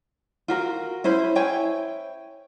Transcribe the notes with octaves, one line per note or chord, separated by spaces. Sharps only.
F4 F#4 A#4
C#4 E4 C5 B5
E4 C#5 G5 G#5